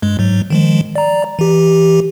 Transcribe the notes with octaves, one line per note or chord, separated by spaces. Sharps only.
G2 G#3
G#2 F#3
D#3 F3 G#3
D5 A#5
E3 G4